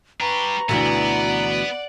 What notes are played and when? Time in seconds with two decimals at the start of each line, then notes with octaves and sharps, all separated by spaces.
0.20 D4 G4 B4 A#5 C#6
0.69 D2 B2 E3 B3 D5 F#5